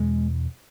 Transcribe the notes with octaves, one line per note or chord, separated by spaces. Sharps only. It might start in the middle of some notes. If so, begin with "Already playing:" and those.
Already playing: E2 B2 G#3